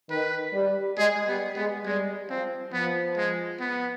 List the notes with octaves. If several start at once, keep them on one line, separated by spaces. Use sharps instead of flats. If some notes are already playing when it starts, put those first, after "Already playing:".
D#3 B4
G3
G#3 G#4
G3 B3
G#3 B3
G3 G#3
F3 C4
F3 B3
G#3
B3